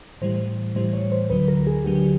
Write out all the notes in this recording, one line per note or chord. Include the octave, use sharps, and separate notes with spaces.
A2 E3 G3 C5
A2 E3 G3 C5
C#5
C5
D2 D3 F#3 B4
A#4
G#4
D2 D3 F#3 G4